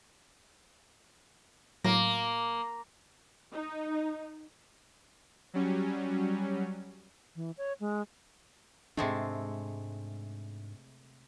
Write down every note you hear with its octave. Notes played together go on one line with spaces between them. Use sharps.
A2 F#3 A#3 A#6
D#4
F#3 G3 C#4
E3
C#5
G#3
G#2 C3 G#3 A3 D4